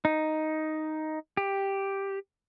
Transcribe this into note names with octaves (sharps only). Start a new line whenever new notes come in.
D#4
G4